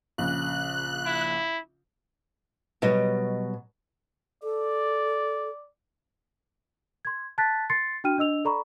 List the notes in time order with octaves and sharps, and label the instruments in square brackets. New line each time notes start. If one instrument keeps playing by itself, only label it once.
[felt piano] A#1 C#3 [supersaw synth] F#6
[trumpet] E4
[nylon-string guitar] B2 F#3 G3 D#5
[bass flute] A4 [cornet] D5
[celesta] C6 G#6
A5 F#6 A6 B6
C6 A6 C7 C#7
D4 F#4 G5 F6 D#7
D4 D#5 E6 F7
A4 D5 A#5 B5 C#6